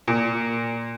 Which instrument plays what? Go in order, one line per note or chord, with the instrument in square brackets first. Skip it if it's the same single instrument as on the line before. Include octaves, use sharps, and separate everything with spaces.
[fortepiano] A#2